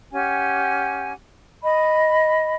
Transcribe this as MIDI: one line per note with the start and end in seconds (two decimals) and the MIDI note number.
0.11 1.12 61
0.11 1.12 67
0.11 1.12 78
0.11 1.12 80
1.63 2.54 75
1.63 2.54 83